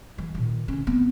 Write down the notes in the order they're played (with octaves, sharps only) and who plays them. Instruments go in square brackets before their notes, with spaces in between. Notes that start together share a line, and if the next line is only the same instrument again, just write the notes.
[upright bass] E3
A#2 D#3
D3 C#4
B3 C4